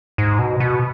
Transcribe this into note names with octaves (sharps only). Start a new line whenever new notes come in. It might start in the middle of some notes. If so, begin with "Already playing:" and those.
G#2
B2
B2